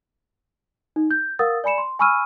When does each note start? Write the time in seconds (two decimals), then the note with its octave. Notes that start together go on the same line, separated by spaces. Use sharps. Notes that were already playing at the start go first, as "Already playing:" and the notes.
0.96 D#4
1.11 G6
1.39 A#4 F5 F#5 D#6 E6 A6
1.64 D5 G#5 B5 C#7 E7
1.78 C6
1.99 G#5 B5 C#6 E6 F6 D#7